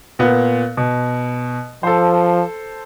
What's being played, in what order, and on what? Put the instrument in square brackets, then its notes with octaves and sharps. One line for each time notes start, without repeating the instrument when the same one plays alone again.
[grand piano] A#2 B3
B2
[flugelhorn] F3 [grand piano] A4 C5